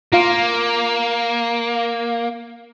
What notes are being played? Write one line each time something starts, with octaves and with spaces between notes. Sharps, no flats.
A#3 F4 F5